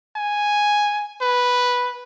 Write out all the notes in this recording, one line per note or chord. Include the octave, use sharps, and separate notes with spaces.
G#5
B4